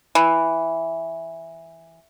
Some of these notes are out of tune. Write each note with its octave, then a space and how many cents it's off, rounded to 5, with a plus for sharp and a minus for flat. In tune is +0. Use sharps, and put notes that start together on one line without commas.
E3 +0